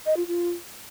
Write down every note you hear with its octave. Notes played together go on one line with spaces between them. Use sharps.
D#5
F4
F4